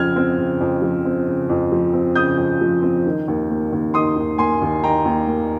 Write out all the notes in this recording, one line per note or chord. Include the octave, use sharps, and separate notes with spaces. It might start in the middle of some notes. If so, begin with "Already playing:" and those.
Already playing: F2 C#3 F3 F6 G#6
C4
C#3
F2
F3
C4
C#3
F2
F3
C4
C#3 D#6 G6
F2
F3
C4
D#3
D#2
A#3
D#2
D#3 C6 D#6
D#2
A#3 G#5 C6
D#2
D#3 G5 A#5
D#2
A#3